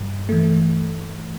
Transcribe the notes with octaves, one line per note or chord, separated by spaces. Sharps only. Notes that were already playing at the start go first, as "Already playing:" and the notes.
Already playing: G2
E3 A3